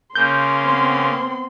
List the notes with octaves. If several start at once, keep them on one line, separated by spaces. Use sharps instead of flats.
C#3 A#3 C6 G6
B3 C4